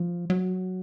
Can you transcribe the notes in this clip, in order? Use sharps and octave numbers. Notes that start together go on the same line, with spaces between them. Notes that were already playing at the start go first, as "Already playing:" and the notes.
Already playing: F3
F#3